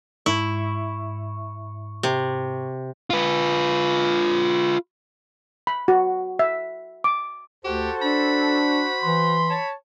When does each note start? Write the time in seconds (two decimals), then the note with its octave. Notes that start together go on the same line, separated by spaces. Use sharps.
0.26 G#2 E4 C#6
2.03 C3
3.10 F4 B4
5.67 B5
5.88 F#4
6.39 E5
7.04 D6
7.65 D2 F#4 G4 A4 C5
8.02 D4 B5
9.03 E3 C6
9.49 C#5 A5